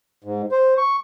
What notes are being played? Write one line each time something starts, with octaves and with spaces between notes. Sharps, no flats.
G#2
C5
C#6